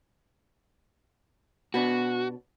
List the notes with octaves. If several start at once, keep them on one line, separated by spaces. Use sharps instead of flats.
B2 B3 D4 F#4